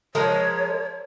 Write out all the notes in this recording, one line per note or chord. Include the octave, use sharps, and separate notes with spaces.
F3 G#3 A#4 C#5